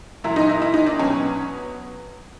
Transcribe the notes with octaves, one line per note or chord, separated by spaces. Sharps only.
A#2 F#3 E4
D#4
E4
E4
D#4
D4
B2 F#3 C#4